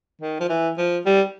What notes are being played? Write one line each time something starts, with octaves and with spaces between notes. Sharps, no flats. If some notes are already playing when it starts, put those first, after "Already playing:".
D#3
F3
E3
F3
G3